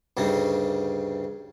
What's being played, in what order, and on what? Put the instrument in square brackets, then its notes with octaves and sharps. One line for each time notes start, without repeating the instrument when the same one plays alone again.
[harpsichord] D2 G2 C#3 D#4